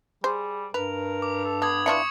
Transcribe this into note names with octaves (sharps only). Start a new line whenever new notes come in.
G3 G#4 C5
G2 A#4 B4 F7
D6
A4
B3 A4 D6 D#6 G#6
E3 D4 F4 C#6 C#7